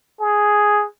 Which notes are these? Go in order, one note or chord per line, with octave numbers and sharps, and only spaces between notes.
G#4